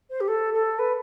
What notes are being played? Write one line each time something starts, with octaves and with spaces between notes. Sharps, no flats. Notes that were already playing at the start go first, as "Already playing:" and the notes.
C5
G4
A4
A4
B4